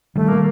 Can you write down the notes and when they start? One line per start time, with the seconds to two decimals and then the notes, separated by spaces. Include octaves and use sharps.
0.16 D#3 G3 A3
0.28 A#3